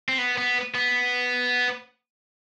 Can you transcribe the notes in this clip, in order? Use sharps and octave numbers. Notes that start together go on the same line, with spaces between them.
C4
B3
B3
B3